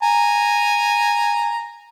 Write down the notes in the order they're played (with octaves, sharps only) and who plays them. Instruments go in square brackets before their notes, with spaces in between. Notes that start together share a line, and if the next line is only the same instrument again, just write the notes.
[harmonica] G#5 A#5